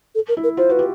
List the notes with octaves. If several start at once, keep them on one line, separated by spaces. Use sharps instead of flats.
A4
A#4
E4
A#4
F4 C5
F#4 B4
F4 G4